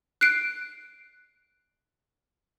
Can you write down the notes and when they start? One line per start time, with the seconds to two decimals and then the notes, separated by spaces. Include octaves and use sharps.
0.21 F#6 C7 D7